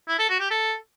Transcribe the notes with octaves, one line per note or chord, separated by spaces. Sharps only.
E4
A4
F#4
G4
A4